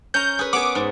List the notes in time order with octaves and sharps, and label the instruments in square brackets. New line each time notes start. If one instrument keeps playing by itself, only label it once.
[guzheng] C#4 A#5 [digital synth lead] G6
[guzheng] G#4 B4
[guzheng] B3 G#4 [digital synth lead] D6
[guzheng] G#2